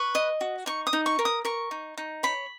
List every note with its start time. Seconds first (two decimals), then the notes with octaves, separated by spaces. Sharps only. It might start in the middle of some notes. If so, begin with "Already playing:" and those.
Already playing: B4 C#6
0.15 D#5
0.41 F#4
0.66 D#4 C#6
0.87 D#6
0.93 D#4
1.06 C#6
1.19 A#4
1.25 D#6
1.45 A#4 C#6
1.71 D#4
1.97 D#4
2.23 C#5 B5